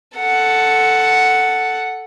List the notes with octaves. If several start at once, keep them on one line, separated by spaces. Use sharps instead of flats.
A4 F#5